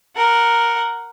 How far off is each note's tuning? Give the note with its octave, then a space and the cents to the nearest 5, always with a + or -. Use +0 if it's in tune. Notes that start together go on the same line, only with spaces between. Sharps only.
A#4 +0 F#5 +0